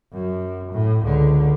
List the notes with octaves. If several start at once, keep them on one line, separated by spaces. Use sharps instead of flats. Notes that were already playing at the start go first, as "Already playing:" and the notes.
F#2
A2
C#2 D3